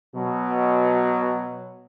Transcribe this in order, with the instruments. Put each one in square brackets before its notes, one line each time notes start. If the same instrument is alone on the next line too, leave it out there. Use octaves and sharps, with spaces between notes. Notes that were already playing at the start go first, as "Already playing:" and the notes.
[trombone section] B2 F#3